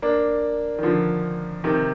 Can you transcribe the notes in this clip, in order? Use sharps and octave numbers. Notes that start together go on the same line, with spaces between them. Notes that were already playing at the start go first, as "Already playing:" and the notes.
A#3 D4
D#3
D3 F3
C3 D#3